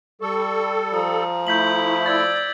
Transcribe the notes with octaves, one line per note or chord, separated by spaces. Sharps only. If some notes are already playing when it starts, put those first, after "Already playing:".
G3 A4 C#6
F3 A#5 D#6
A3 E4 G6 B6 F#7
D5 E6 G#6 A6